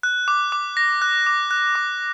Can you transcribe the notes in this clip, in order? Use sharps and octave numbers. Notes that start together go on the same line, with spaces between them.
F#6
D6
D6
A#6
F#6
D6
F#6
D6